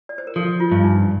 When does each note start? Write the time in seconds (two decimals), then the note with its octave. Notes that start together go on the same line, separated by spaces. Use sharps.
0.09 D5
0.18 C5
0.27 A#4
0.36 F3 A4
0.60 F4
0.71 G2
0.84 D#4